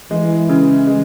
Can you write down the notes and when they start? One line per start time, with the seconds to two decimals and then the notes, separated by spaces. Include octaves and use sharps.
0.10 E3 G#3
0.49 C#3
0.87 G#3